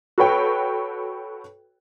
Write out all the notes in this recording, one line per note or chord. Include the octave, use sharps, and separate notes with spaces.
F#4 A4 B4 C#5 G5